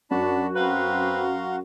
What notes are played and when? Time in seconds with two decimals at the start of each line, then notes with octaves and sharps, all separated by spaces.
0.11 F#2 D4 F#4 A5 B5
0.56 C4 B4 F5 A#5 C6